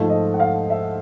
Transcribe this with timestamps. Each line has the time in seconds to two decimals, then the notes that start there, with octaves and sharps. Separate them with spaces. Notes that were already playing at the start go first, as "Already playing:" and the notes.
Already playing: G#2 F3 A3
0.10 D#5
0.34 F#5
0.40 F5
0.70 E5